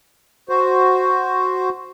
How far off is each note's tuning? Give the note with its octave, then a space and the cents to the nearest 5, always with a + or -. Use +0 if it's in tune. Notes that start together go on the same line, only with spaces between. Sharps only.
F#4 +0 C5 +0